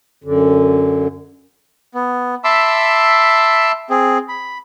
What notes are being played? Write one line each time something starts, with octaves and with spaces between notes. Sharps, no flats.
F#2 D3
B3
E5 A5 B5 C6 D6 E6
C4 G#4
B5